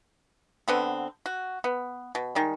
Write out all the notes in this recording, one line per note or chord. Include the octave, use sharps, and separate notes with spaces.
D3 B3 C4
F#4
B3
B2
D#3 G3 G#3